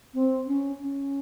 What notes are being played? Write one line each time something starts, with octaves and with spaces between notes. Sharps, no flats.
C4
C#4
C#4